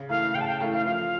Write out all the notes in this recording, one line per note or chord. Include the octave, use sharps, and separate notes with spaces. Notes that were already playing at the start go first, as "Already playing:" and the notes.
Already playing: C#3
E3 A3 F5
C#3 G5
A5
G5
E3 A3 F5
F5
F3 F5